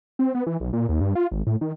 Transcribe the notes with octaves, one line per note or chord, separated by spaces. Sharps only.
C4
B3
E3
B1
A#2
D#2
G2
F4
G#1
A2
D#3